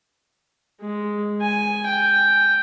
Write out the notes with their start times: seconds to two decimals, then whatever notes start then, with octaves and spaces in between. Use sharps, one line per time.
0.81 G#3
1.42 G#5
1.86 G5